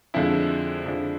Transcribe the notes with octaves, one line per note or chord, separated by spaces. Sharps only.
F2 D3 F3 G#3 E4
F2 D3 F3 G#3